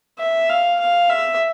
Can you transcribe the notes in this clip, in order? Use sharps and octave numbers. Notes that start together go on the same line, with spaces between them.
E5
F5
F5
E5